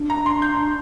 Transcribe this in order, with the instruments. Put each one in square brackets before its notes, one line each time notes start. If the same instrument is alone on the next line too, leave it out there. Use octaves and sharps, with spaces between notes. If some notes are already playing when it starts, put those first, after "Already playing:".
Already playing: [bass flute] D4
[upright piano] A#5
C6
G6